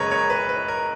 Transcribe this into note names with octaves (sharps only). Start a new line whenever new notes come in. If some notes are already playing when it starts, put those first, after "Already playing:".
Already playing: F#1 F#2 C#3 G#3 A#4 B4 C#5 D#5
A#4 C#5
B4
B4
A#4